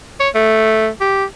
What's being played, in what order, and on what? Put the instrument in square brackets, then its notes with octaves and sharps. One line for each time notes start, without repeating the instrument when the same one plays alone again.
[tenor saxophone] C#5
A3
G4